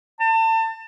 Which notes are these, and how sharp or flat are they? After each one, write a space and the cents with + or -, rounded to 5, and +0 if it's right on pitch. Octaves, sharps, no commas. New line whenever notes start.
A5 +30